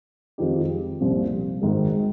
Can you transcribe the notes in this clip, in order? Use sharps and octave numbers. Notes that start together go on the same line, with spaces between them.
F2 D#3 G#3 D#4 G4
C2 A#2 F3 C4 G4
G#1 G#2 D#3 G#3